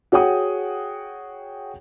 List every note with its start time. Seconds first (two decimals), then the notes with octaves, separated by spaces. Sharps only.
0.12 F#4 G#4 C#5 F#5 G5 D#6